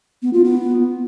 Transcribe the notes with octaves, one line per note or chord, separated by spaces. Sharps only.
B3
F4
B3